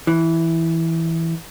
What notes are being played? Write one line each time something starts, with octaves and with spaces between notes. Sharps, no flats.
E3